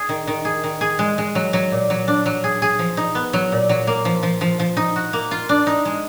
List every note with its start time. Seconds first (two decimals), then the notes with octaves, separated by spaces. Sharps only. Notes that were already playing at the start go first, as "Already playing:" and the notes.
Already playing: G#4
0.09 D#3
0.27 D#3
0.45 G#4
0.64 D#3
0.81 G#4
0.99 G#3
1.18 G#3
1.35 F#3
1.53 F#3
1.71 A#2
1.90 F#3
2.08 D4
2.26 F#3
2.44 G#4
2.62 G#4
2.79 F3
2.97 D#4
3.15 B3
3.33 F#3
3.52 A#2
3.69 F#3
3.87 A#3
4.05 F3
4.23 F3
4.41 F3
4.60 F3
4.77 D#4
4.96 F#4
5.13 A#3
5.31 F4
5.49 D4
5.67 D#4
5.85 G#3